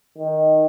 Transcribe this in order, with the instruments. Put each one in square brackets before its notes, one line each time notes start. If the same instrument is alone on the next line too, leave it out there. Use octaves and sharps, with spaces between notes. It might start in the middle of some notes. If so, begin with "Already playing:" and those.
[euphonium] D#3